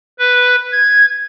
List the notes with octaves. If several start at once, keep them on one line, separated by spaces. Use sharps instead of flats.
B4
G#6